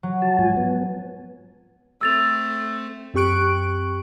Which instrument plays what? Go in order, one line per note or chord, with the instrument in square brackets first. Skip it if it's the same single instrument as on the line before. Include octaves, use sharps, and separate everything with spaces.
[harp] F#3
[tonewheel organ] F#4 A5
G#2 F3 G#5
B3
[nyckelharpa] A3 C4 [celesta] E6 A6 F7
[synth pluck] F#2 C4 G4 C#6 F#6 D7